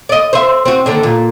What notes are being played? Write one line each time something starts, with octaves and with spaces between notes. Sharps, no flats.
D5 D#5
C5 E5
C4 F#4
D#2 D3 D4
A#2